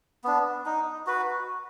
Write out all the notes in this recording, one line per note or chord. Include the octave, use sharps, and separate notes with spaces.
B3 D4
D#4
F#4 B4